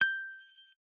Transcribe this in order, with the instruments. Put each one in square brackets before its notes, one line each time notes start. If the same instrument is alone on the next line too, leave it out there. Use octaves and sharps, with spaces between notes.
[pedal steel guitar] G6